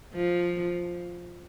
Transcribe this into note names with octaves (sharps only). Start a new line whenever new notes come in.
F3